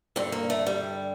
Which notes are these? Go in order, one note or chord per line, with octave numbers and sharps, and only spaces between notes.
G2 D3 C4
A#3
A3
G3